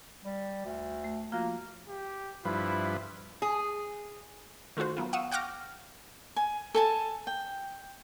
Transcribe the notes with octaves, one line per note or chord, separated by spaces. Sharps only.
G3
D2
A3
F3 A#3 F4 F#4
G4
G2 F3 E4 B4
G#4
D#3 A3 F4 F#4 C5
F#3 B3 F4
F5 F#5 C#6 D#6 E6
F#5 G5 C#6 D6 F6 A#6
G#5
A4 G#5 A5
G5